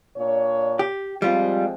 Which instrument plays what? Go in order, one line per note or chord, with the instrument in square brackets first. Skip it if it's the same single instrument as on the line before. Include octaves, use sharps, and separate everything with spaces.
[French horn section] A#2 D4 C#5
[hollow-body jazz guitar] G4
[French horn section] F3 G#3 C4 [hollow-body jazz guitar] G3 F4